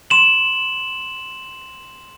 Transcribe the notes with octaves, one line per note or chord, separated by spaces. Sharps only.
C6 E7 F#7